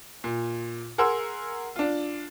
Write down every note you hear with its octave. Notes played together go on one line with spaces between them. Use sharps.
A#2
G#4 A#4 F#5 C6 E6
D4 F4